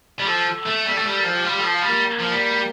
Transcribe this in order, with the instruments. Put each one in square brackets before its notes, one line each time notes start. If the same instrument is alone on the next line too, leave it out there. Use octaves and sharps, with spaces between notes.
[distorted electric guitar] G3
[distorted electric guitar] F3 [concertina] A4
[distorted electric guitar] A3
G3
A3
G3
[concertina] A#4
[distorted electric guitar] F3 [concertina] A4
[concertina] G4
[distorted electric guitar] G3 [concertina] F4
[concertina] G4
A4
[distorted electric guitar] F3
[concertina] F4
[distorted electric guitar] G3
[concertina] A#3
[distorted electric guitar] F3
G3